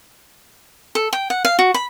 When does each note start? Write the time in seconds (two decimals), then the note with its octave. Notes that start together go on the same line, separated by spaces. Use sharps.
0.95 A4
1.13 G5
1.30 F#5
1.45 F5
1.59 F#4
1.74 B5